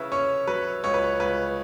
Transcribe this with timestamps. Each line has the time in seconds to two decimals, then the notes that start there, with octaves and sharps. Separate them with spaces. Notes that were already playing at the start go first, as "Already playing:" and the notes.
Already playing: C#3 E4 B4 C#5 E5
0.12 C#4 C#5
0.47 F#3 B4
0.84 C#2 C#5
0.94 B4
1.04 C#5
1.20 C#2 B4